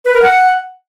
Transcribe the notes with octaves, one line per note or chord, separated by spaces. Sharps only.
B4
A#4
F#5